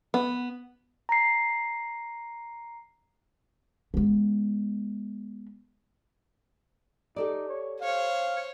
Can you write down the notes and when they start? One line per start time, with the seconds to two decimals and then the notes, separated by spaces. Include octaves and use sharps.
0.14 B3
1.09 A#5 C7
3.94 G#3 B3
7.16 D#4 G4 A4 D5
7.49 C#5
7.81 C5 C#5 F5